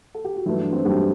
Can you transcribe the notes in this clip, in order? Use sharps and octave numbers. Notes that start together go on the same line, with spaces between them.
A4
G4
F#4
G2 E3 F#3 A3 E4
D4
C4
G2 F#3 G3 A3 G4